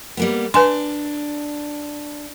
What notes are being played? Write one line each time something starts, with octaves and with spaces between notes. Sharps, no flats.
G3 A#3 B3
D4 B4 G#5 C6